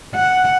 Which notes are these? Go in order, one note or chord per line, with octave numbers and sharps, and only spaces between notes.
F#5